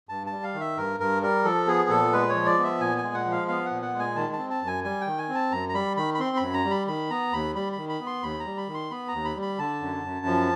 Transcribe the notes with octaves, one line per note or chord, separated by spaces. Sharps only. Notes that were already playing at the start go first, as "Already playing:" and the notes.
G2 A5
G3 A5
F5
D#3
E5
G2 A#4
G2 A#4
G3 A#4
F3 A4
B3 G#4
A#2 A4
G#3 B4
C#5
F3
D5
B3
E5
A#2 G#5
G#5
G#3
F#5
F3
F5
B3 F5
F#5
A#2
F#5
G#3
G#5
D#3 A5
A5
C4
A5
F#2
G#5
G3 G#5
G5
D#3
G#5
C4
A5
F#2 A#5
A#5
G3 B5
D#3 B5
B5
C4 C6
F#2 B5
A#5
G3
B5
D#3 B5
B3 A#5
D#2 B5
G3 B5
B5
D#3
B5
B3
C6
D#2 B5
A#5
G3
B5
D#3
C6
B3 B5
A#5
D#2
B5
G3
B5
D3 A5
F#2
F#2
F3